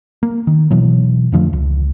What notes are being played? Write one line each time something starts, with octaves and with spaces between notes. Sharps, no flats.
A#3
D#3
B2 E3 F#3
F2 D3 F3 A3
C#2